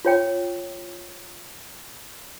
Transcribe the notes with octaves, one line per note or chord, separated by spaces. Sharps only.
F4 C#5 G5